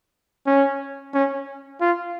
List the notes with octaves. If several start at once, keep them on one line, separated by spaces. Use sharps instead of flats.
C#4
C#4
F4